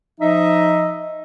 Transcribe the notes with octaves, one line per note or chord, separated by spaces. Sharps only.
F3 D#4 D#5 E5